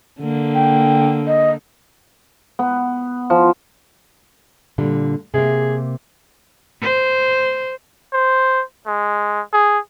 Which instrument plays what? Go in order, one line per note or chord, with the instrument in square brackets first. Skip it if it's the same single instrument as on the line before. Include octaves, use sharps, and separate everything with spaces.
[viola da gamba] D3 A#3
[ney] G5
D#5
[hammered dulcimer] B3
F3
[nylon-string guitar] A#2 D3 G3
[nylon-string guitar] C3 A#3 [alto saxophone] G#4
[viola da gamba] C5
[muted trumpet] C5
G#3
G#4